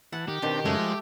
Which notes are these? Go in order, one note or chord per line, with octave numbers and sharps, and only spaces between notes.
E3 F#5 A5
D#3 G4
B2 D#3 C4 D4
F#2 C#3 G#3 A3
F3